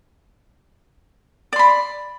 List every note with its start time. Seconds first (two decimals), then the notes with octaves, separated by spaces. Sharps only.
1.53 D5
1.56 C6
1.59 B5